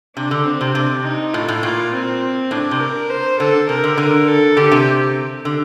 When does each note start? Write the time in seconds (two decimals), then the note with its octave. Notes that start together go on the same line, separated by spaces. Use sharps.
0.16 C3 D4
0.31 D3
0.45 C4
0.61 C3
0.75 C3 D4
1.04 D#4
1.34 A2 F4
1.48 A2
1.63 A#2 F4
1.93 C4
2.51 A2 D4
2.71 C3
2.80 A#4
3.10 C5
3.39 D3 A4
3.68 C3 A#4
3.84 D3
3.98 D3 A#4
4.27 A4
4.57 D3 G4
4.72 C3
5.45 D3